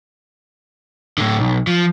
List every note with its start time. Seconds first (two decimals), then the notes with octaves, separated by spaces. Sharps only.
1.18 A2 D3
1.39 B1
1.67 F3